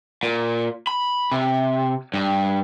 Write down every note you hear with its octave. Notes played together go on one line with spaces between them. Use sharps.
A#2
B5
C3
G2